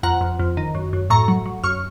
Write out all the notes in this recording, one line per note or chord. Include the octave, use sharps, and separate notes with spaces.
F2 F#5 A#5
F2
F2
D#3
F#2
F#2
A2 A#5 C#6
F#3
F#3
F#2 C#6 F6